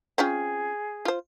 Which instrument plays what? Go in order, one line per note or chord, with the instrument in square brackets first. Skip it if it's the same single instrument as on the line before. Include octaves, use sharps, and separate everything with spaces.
[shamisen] C4 C#4 F4 [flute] G#4
[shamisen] F4 C5